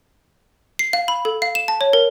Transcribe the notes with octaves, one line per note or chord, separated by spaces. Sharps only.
C7
F5
B5
A4
F5
E7
A5
C#5
A#4